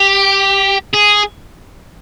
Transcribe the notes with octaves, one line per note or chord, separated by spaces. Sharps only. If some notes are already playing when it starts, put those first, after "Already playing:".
Already playing: G4
G#4